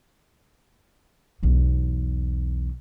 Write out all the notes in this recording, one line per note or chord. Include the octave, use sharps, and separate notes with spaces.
B1 E2